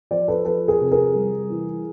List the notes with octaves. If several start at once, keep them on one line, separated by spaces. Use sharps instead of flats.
F3 C5 D5
A4 B4
F3 A4 B4
G#4 A#4
C3
G#4 A#4
G3
E3